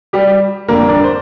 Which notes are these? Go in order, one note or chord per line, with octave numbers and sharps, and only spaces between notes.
G3 G4
F2 D3 G3 A#3 A#4
D4 D5
C5